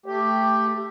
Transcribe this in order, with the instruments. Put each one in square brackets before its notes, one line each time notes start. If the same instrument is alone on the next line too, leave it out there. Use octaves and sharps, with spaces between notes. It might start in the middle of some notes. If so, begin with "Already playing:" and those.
[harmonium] A3 G4